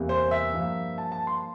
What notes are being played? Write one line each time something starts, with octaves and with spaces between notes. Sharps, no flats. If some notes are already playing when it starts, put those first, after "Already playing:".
Already playing: E2 C3 G3 A#3
C5
E5
G2 F3 A#3
A5
A5
C6